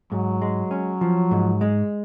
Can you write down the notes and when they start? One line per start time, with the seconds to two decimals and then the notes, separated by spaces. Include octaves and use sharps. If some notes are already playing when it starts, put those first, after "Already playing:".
0.12 G#2 F#3
0.42 G#3
0.71 C#4
1.01 F3
1.31 G#2
1.61 G#3